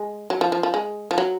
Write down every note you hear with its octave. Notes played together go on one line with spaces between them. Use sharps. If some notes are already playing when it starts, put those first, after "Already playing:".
Already playing: G#3
F#3
F3
F3
F3
G#3
F3
F#3